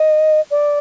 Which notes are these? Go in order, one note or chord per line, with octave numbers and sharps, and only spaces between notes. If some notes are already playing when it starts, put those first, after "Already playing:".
Already playing: D#5
D5